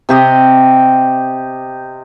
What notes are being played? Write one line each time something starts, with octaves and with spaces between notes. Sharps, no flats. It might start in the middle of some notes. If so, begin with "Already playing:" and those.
C3 G4 D#5